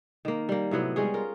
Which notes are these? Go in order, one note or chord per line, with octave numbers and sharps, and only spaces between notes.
D#3 A#3
G3 A#3
A2 C3 F#3 B3
G3 G#3 C#4 G#4
F4 A#4